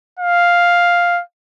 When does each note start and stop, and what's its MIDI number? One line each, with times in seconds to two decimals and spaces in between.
0.19 1.22 77